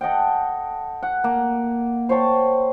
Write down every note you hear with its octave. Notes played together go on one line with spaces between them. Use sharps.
A4 D#5 F#5 G5
F#5
A#3
C5 C#5 G5 A5